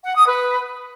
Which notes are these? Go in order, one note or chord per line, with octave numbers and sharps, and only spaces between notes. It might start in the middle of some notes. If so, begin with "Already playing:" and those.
F#5
D#6
B4